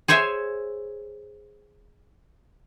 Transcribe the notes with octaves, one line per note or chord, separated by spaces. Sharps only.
G#4 C5 C#5 E5 G#5